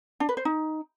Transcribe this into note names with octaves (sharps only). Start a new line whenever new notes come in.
D4
B4
C5
D#4